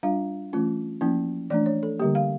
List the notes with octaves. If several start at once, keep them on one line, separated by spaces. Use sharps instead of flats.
G3 D4 F4 F5
E3 A3 C#4 F4
F3 A#3 C#4 E4
E3 A3 D4 D5
C#5
A4
D3 G3 A#3 G4
F5